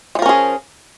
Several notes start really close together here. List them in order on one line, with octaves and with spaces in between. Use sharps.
G#3 F3 A#4 C#4 G#4